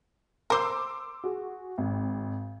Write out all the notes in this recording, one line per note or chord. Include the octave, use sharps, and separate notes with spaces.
A#4 C5 C6 D6 E6
F#4 G#4
G#1